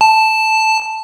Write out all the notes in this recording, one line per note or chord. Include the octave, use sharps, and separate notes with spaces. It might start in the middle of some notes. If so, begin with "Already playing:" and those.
A5